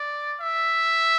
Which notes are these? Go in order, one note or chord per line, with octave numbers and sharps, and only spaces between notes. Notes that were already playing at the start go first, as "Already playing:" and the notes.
Already playing: D5
E5